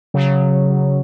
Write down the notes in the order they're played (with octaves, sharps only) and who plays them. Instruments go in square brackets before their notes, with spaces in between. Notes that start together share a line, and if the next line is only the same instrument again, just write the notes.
[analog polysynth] C#3 F#3